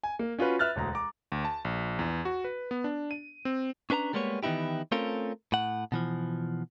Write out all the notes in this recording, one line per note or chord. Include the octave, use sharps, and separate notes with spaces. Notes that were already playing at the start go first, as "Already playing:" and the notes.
G#5
A#3
C#4 F4 F#4 B4
B4 E5 F6 F#6 A6
E1 D2 A#5
A#5 D6
D2
A5
A#1
E2
F#4
B4
B3
D4
D#7
C4
C#4 D4 B4 A5 A#5
G3 G#3 A#3 B3 C#5
D#3 E3 B3 D#4 E4 G4
A3 C4 C#4 F4 A4 A#4
A2 F#5
B2 E3 F3